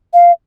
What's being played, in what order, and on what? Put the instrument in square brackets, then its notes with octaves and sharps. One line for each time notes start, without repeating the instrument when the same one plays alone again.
[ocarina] F5